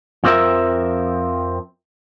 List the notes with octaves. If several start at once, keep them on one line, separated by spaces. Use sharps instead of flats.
F2 F3 C4 F#4 A#4 E5